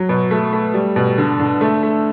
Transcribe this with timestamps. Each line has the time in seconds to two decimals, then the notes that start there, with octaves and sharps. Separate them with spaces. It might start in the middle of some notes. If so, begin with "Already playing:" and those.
Already playing: F#3
0.09 B2
0.31 A3
0.53 A3
0.74 G3
0.96 B2
1.18 D3
1.40 D3
1.61 A3
1.83 A3